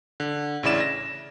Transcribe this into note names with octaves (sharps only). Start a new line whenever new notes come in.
D3
A1 C#3 E4 D5 E7
A#6